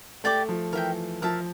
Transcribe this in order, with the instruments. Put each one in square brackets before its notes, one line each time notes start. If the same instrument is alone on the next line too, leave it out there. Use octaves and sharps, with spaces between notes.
[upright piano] A3 [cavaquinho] G4 D5 G5 D6
[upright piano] F3
[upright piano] E3 [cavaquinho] A#4 E5 G5
[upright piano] F3 [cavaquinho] A#4 E5 A5